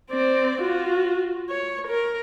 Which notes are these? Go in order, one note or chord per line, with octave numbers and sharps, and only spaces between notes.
C4 D5
F4 F#4
C#5
A#4